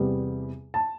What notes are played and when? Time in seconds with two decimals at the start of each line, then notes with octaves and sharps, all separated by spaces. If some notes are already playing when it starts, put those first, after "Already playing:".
Already playing: E2 C3 G3 B3
0.74 A5